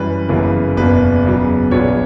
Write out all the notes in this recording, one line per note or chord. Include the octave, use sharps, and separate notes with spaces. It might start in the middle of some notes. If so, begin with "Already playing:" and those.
Already playing: F#2 E3 G3 B4
G1 F#2 C#3 E3 A#3
F#1 E2 B2 A#3 D4 B4
E2 C#3 F#3
A#1 A#2 F#3 B3 D4 C#5